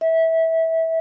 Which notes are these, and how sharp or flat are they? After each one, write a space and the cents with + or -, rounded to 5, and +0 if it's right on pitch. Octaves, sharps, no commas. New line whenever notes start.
E5 -20